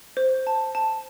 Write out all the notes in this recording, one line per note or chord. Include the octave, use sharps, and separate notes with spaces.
C5
A5
A5